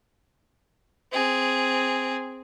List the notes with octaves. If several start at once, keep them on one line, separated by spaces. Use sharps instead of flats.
C4 G#4